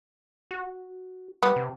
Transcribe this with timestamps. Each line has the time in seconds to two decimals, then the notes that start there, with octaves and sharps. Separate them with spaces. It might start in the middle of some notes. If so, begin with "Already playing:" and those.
0.51 F#4
1.43 G3 B3
1.56 C3